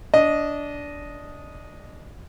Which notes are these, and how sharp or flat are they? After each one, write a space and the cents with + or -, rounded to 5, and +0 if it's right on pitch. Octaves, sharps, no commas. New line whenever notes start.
D4 -15 D#5 +0